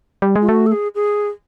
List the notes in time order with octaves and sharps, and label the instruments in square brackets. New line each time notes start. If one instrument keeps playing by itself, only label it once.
[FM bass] G3
G#3
[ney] F4
[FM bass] A3 [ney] F#4
[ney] A4
G#4
G#4